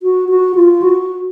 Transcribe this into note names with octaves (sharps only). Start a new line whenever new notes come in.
F#4
F#4
F4
F#4